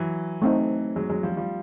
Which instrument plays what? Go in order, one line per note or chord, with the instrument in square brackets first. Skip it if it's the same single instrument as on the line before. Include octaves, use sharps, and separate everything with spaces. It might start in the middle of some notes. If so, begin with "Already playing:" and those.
Already playing: [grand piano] E3 F#3
[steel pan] A3 C4 D#4
[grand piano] F#3 G#3
F#3 G#3
F3 G3
F3 G3